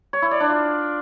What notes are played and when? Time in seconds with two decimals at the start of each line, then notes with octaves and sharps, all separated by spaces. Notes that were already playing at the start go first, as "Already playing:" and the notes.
0.13 C#5
0.22 E4
0.31 D5
0.40 D4
0.49 F4